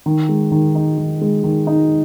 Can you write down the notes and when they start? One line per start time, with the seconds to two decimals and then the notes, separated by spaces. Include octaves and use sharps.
0.06 D#3
0.29 G#3
0.52 D#3
0.75 D#4
0.98 D#3
1.21 G#3
1.44 D#3
1.67 D#4